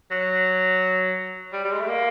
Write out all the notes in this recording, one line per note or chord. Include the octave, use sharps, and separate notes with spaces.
F#3
G3
G3
G#3
A3
A#3